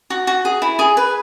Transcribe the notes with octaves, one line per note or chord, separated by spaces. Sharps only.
F#4
F#4
G#4
E4
G#4
B4